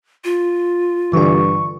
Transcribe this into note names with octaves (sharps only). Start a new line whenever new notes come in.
F4
G2 D3 E3 C#6